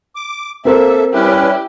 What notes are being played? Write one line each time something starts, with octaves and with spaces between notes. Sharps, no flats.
D6
A#3 C4 A4 A#4 C5 E5
G3 C#4 E4 G4 B4